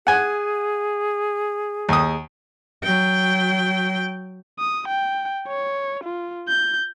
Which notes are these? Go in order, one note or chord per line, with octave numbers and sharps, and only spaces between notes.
G#4 F#5 G#5
D#2 D#6
F#3 G5
D#6
G5
C#5
F4
G6